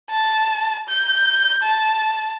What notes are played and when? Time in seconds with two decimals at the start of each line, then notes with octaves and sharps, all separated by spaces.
0.11 A5
0.89 G6
1.63 A5